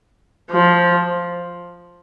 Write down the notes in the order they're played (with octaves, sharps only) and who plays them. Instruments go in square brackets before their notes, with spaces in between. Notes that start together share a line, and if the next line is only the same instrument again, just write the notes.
[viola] F3